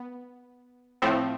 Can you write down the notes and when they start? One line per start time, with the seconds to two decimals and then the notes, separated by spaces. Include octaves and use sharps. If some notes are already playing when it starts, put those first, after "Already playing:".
Already playing: B3
1.02 A2 F3 A3 C4